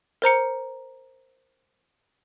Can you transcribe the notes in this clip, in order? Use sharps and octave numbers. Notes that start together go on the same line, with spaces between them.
A#4 C5 A#5 C#7